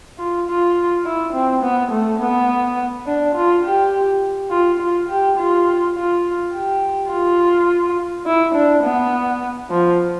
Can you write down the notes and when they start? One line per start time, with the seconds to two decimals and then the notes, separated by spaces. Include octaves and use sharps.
0.18 F4
0.47 F4
1.05 E4
1.33 C4
1.63 B3
1.91 A3
2.20 B3
3.06 D4
3.35 F4
3.65 G4
4.50 F4
4.80 F4
5.09 G4
5.37 F4
5.95 F4
6.53 G4
7.11 F4
8.26 E4
8.55 D4
8.83 B3
9.70 F3